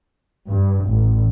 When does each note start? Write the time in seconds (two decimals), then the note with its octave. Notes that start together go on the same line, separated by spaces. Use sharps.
0.49 G2
0.86 A1